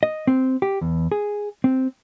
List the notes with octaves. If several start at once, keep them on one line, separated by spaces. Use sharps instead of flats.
D#5
C4
G4
E2
G#4
C4